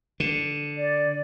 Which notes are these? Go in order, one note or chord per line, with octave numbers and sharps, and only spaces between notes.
D3
D5